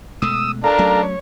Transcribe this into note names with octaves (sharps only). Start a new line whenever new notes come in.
B2 G#3 A3 D#6 E6
D4 A4 A#4 F5 A#5
F#3 A3 C#4
C#5